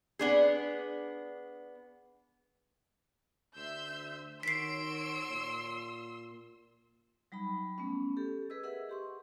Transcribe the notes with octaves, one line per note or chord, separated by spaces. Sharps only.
B3 D4 G#4
D2 E5 C6 E6 G6
D#3 F#4 C#5 C6 E6 B6 C7 D7
A#2
F#3 G3 D#4 B5
A3 B3 C#4
G4 A4
G#4 B4 D#5 E6
G#4 A#4 D#5 E5 F#5
G4 C6 C#6